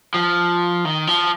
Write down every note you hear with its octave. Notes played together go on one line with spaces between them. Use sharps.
F3
D#3
F3